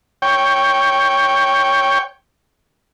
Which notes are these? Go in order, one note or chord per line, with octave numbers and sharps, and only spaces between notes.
C#5 G5